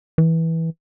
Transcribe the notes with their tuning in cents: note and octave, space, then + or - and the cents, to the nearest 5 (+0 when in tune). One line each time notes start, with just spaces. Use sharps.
E3 -15